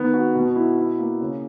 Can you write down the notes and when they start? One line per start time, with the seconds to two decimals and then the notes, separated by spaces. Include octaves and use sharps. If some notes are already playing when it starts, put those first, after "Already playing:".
Already playing: D#3 B3
0.14 F#4
0.35 B2
0.56 E4
0.78 E4
0.99 A#3
1.21 C#3